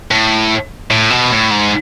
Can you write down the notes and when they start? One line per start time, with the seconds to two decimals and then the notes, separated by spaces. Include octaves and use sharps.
0.11 A2
0.90 A2
1.10 B2
1.31 A2
1.51 G#2